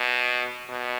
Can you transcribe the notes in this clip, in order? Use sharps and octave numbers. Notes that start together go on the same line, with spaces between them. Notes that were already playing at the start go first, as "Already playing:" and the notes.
Already playing: B2
B2